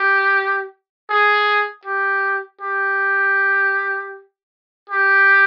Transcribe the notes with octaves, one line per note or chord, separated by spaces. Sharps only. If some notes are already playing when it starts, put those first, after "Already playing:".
Already playing: G4
G#4
G4
G4
G4